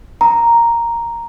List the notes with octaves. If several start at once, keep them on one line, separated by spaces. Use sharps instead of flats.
A#5